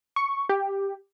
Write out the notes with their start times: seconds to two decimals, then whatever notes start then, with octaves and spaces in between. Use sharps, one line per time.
0.16 C#6
0.49 G4